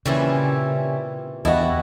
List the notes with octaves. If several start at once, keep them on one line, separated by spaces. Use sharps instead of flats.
A#2 C#3 E3 G3 C4 C#4 E4
E2 E4 F#4 G4 D#5 F#5 A5